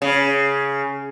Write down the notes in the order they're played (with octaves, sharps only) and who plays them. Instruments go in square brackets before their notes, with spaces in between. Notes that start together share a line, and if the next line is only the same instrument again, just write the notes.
[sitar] C#3